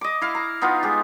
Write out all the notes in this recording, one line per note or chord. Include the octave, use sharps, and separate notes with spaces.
D#5 D6
E4 F5
A#5
B3 D#4 F4
G#3 G4